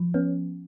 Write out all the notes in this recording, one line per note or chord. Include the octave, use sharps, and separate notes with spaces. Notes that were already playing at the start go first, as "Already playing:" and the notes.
Already playing: F3
B3 C#4